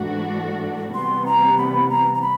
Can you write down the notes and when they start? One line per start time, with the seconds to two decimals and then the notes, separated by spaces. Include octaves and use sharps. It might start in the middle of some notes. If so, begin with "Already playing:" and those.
Already playing: G#2 E3 A3 D4 F#4
0.93 C3 E3 G3 B3 C6
1.26 A#5
1.58 B5
1.89 A#5
2.15 A#5
2.22 B5